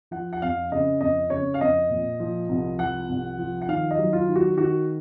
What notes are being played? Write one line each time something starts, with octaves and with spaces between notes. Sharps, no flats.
F3 F#5
F#5
F2 F5
C#3 D#5
F2 D#5
C#3 C#5
F5
F2 D#5
A#2
F3
C2
F3 F#5
C2
F3
F#5
D#3 F5
D#5
F#3
F4
D#3
F#4
D#3 F#4